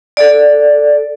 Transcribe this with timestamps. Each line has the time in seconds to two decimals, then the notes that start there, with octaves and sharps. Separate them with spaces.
0.17 A4 D5